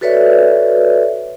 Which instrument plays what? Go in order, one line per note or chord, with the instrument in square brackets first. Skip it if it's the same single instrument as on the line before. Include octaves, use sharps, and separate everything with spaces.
[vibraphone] F#4 A4 B4 C#5 D5 E5